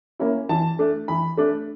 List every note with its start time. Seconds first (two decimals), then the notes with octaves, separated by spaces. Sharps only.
0.19 A#3 C#4 E4
0.49 E3 A5
0.79 A3 D4
1.08 E3 B5
1.37 A3 D4